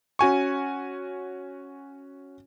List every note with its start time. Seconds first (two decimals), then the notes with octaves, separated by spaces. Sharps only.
0.19 C#4 F#4 G#5 C#6